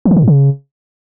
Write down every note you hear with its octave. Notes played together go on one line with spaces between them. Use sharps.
E3
D#3
D3
G#2
C#3